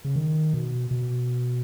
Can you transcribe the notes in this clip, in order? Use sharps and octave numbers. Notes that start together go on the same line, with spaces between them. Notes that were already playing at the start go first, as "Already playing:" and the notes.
C#3
D#3
B2
B2